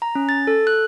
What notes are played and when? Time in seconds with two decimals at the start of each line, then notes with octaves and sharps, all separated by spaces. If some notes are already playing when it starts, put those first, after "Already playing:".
0.02 A#5
0.15 C#4
0.29 A6
0.47 A4
0.67 F#6